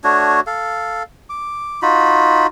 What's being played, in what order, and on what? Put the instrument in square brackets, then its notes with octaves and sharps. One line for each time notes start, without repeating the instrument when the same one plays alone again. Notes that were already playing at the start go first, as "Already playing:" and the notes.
[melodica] A3 D4 F#4 C#5
A4 F5
D6
D#4 F4 F#4 B5